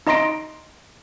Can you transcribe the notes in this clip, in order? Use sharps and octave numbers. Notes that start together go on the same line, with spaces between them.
D#4 D#5 A#5 C6 A#6 D7